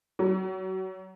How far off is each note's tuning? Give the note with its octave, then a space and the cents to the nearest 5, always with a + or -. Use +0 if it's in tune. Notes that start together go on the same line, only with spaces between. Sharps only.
F#3 +30